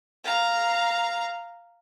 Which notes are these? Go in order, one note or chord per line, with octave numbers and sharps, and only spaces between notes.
F5 A#5